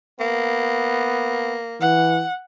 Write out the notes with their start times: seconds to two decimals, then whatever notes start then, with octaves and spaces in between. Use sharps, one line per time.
0.20 A#3 B3
1.81 E3 F#5